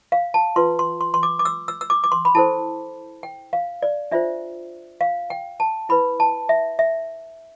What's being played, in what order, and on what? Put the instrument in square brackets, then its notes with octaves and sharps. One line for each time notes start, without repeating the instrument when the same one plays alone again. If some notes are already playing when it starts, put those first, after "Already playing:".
[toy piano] F5
A5
F4 B4 C6
C6
C6
C6
D6
D6
E6
E6
E6
D6
D6
C6
B5
E4 A4 C5 A5
G5
F5
D5
D4 F4 C5 E5
F5
G5
A5
E4 B4 B5
A5
E5
E5